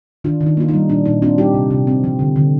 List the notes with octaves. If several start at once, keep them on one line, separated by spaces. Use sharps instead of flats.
D#3 D4 F4
D#3
D#4
A#3 F4
D#4
G3
A#2 D4
A#2 D#4
C4 D4 F4
G3 D#4 G4
C3
C3
C4
F3
D3
D3